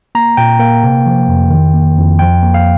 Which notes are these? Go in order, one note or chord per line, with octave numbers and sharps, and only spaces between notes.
A#3 A#5
A#2 G5
A#3 G5
C3
F3
F2
D#3
A#3
F2
F3 G5
A#3
F5